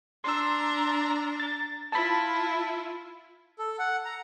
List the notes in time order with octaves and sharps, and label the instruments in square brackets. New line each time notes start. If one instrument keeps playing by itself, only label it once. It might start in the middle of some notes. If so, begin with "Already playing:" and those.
[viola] D4 A#5 [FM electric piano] C6 E6
[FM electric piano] A6
[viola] E4 F4 [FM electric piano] A5 B5
[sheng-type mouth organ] A4
F#5
A#5